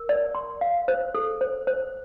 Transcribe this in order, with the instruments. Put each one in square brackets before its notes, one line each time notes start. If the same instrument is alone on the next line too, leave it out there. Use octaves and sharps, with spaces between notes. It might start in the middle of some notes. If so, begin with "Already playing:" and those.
Already playing: [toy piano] A#4
D5
C6
F5
C5
A4
C5
C5